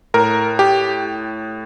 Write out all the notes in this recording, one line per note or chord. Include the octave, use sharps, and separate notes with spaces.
A2 A#4
G4